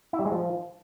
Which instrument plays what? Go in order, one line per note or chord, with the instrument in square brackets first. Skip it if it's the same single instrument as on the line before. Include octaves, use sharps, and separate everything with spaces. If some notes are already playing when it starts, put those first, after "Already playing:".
[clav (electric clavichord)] E4
G3
G#3
F3